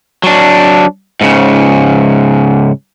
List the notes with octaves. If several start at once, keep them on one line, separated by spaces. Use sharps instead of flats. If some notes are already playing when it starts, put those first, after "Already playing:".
F#3 D4
G#2 C#3